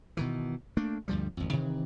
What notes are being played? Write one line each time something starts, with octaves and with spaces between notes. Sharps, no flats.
B2 D#3 E3
A3 A#3 D4
D2 G2 F3 G3
G#1 F2
C3 D#3 E3